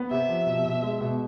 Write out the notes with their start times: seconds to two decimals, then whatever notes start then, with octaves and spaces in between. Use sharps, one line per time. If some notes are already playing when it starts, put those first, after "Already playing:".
Already playing: B3
0.11 C3 E5
0.29 F3
0.47 B2
0.65 B2
0.83 G#3
1.01 B2